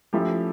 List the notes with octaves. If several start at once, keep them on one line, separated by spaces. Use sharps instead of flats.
F3 A3 C#4 E4 G4